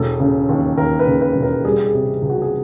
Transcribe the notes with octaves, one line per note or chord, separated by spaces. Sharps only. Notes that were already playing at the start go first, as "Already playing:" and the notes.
Already playing: E1 A4
C#3
D#2
D#2 A#4
B4
C#3
B4
E1
A#4
G3 G#4
G#4
C3
C#2
F#4
G#4